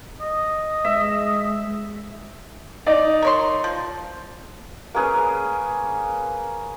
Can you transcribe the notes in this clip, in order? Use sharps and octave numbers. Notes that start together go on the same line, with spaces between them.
D#5
G#3 E5
D#4 D5
A#4 C#5 C6
F3
A#3 C#4 G#4 B4